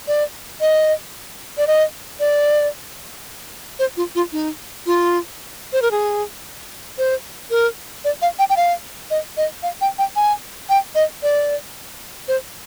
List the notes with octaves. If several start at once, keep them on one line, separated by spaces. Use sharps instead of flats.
D5
D#5
D5
D#5
D5
C5
F4
F4
D#4
F4
C5
A#4
G#4
C5
A#4
D5
F5
G5
G5
F5
D#5
D#5
F5
G5
G5
G#5
G5
D#5
D5
C5